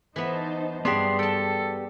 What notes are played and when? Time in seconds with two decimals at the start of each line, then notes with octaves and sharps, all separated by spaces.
0.16 E3 B3 D#4 C5 A5
0.85 G2 B3 D4 G4 G#4 D5 C6
1.19 A4 G5 A5